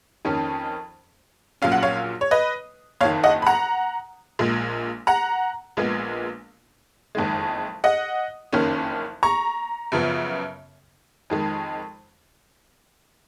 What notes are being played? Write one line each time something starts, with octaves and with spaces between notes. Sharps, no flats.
F2 D#3 A#3 C#4
A#1 A#2 F#3 C#4 F5
F#5
C#5 F5
C#5
B4 D#5
F#1 F2 D#3 C#5 F5
D#5 F#5
B5
F#5 A#5
A#1 A#2 G#3
F#5 A#5
A#1 A#2 G#3 B3
F#1 F2 D#3 G#3
D#5 F#5
F#1 F2 D#3 A#3 C#4
A#5 C#6
F#2 C#3 F3 B3
F2 D#3 G#3